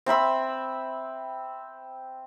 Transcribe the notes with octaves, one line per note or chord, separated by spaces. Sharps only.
C4 E5 B5 E6